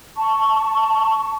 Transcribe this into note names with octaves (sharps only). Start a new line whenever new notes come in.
A5 C#6